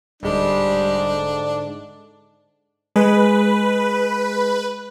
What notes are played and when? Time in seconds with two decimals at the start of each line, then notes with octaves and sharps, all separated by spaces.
0.23 D1 G#2 D3 G3 G#3 D4
2.96 G#3 B4